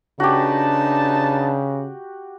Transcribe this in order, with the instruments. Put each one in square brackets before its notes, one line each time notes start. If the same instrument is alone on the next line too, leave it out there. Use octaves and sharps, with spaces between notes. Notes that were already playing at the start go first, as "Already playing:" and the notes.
[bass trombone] C#3 [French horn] D4 [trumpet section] D#4 B4 A5 [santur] F#4 G4